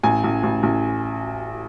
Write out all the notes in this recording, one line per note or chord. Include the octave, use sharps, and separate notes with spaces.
A1 G#5
A1
A1
A1